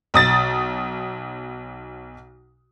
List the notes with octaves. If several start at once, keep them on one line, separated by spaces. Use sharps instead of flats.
B1 D#6 A6